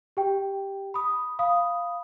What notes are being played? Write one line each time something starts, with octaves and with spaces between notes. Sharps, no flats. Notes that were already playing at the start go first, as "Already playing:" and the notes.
G4 G5
B5 D#6
F5 B5 D#6